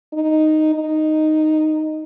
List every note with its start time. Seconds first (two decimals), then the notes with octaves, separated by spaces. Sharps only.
0.13 D#4
0.75 D#4